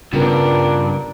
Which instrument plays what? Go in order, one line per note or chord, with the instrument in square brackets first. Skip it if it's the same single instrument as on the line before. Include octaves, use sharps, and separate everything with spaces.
[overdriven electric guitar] G2 [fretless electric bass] C#3 B3 [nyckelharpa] D4 A#4 [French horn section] F4